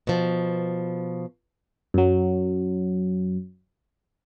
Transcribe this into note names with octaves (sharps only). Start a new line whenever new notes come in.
B2 F3
F#2 F#3